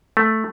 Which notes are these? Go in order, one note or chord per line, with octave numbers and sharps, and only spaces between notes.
A3